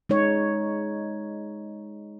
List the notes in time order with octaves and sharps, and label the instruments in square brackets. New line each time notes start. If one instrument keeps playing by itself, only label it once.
[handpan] G#3 D#4 C#5